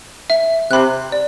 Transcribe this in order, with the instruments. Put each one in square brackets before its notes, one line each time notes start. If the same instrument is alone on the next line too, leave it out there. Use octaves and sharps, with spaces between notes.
[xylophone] E5
[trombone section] C3 [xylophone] B5 F#6
[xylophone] D5